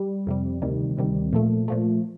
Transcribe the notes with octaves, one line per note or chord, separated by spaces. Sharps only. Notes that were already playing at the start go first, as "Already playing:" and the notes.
Already playing: G3
F2 C3 G3
D2 C3 D#3 G3
D2 C3 D#3 G3
A#2 F3 A3
A#2 F3 A3